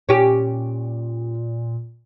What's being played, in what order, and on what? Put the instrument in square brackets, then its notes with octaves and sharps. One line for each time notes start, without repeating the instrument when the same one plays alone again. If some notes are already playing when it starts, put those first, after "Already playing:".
[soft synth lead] A#2 [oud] C#4 G4